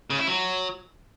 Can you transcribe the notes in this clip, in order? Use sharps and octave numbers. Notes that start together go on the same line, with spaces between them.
C#3
E4
F#3